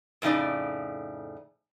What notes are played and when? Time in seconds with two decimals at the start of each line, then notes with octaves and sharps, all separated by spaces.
0.22 F2 A2 C#3 D#4 D5